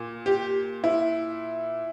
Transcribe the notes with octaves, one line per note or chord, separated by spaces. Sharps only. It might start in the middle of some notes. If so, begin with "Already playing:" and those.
Already playing: A#2
G4
E4